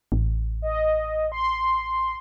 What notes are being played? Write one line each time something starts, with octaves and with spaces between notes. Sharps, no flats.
A1
D#5
C6